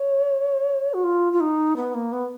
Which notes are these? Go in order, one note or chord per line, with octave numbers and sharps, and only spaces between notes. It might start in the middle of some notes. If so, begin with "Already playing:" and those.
Already playing: C#5
F#4
F4
F4
D#4
B3
A#3
B3